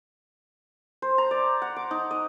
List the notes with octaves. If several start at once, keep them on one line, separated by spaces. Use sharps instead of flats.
C5
A#5
D5
F#5
D6
D#4
D#5